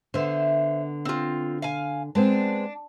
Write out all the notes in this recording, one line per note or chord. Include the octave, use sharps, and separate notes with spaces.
D3 B3 C5 E5
C4 F4
F5 G#5
G#3 B3 C4 D4